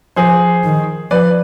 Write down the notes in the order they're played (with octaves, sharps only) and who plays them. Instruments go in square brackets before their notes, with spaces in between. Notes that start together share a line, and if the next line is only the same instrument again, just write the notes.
[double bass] F3 [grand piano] G#4 C5
[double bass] D#3
[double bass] F3 [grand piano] B4 D5